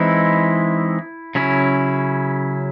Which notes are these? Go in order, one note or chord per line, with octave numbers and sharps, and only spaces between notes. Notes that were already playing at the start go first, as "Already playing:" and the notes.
Already playing: E3 G#3 C4 D#4 E4
C#3 F#3 C#4 E4